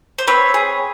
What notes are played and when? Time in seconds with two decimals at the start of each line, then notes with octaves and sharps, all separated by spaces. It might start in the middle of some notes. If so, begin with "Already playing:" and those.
0.18 C5
0.27 C4 B4 C#5
0.54 G#4